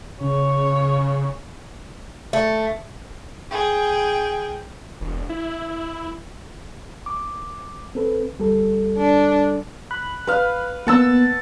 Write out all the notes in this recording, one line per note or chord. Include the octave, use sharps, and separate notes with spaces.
C#3 C#5
A3
G#4 G5
E1
E4
D6
C4 A4 B4
D2 G3 A4
D4
B5 F#6
B4 F5
A#3 B3 F#5 A5 E6